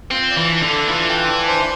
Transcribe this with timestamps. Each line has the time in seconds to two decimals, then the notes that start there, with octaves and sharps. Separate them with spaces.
0.11 C4 F4
0.31 D5
0.37 E3
0.50 D4
0.63 D3
0.69 A4
0.88 E3 F4
1.09 G5
1.28 D4
1.48 C5